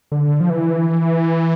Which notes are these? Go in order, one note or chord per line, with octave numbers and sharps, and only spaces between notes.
D3
F3
E3